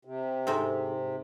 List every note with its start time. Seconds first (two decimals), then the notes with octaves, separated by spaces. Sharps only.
0.05 C3
0.47 G#2 C4